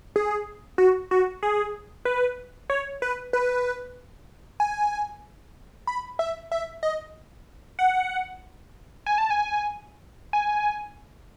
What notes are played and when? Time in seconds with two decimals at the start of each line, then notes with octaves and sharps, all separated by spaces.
0.16 G#4
0.78 F#4
1.11 F#4
1.43 G#4
2.05 B4
2.70 C#5
3.02 B4
3.33 B4
4.60 G#5
5.87 B5
6.19 E5
6.52 E5
6.83 D#5
7.79 F#5
9.06 G#5
9.18 A5
9.30 G#5
10.33 G#5